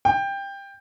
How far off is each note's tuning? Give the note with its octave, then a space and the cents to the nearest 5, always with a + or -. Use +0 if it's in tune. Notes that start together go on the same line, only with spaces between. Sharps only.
G5 +15